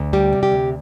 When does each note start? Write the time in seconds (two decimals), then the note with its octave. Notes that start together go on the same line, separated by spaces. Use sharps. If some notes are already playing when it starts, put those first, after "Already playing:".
Already playing: D2
0.13 G3 G4
0.33 C3
0.43 G4
0.52 D2